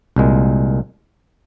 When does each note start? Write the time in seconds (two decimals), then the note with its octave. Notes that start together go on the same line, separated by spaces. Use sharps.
0.16 C2 A#2 G#3